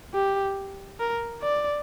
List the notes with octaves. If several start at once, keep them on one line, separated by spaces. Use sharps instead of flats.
G4
A#4
D5